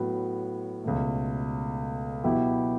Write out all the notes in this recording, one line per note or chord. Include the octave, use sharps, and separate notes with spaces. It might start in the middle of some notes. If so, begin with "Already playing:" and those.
Already playing: A2 F#3 B3 F#4
C#2 B2 A3
B2 F#3 B3 E4 G4